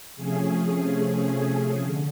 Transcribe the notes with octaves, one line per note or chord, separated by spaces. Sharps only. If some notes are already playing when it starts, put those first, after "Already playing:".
C3 F3 A3 C#4 G#4
D3